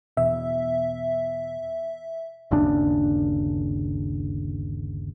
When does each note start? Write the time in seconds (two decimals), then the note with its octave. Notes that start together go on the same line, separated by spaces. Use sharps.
0.17 E2 B2 E5
2.51 G1 D#2 C#3 D4